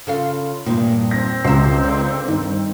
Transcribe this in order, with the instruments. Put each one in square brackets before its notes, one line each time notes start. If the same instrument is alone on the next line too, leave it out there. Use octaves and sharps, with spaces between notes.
[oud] C#3 A4 F5 [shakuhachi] F4
[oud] E2 G2 D#3 [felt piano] A#2
[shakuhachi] C4 [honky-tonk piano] A#6
[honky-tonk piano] C#2 [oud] B2 E5 [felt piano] A#5 C6 C7
[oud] D3
[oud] G2 [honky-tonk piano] D#3